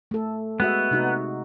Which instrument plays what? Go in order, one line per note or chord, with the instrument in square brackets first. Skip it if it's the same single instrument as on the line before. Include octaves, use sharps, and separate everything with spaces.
[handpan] A3 A4
[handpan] G#3 F#4 E5 [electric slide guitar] B3
[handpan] C3 D#4 F#4